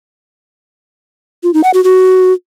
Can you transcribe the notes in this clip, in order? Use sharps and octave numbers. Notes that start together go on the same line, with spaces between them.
F4
D#4
F#5
F#4
F#4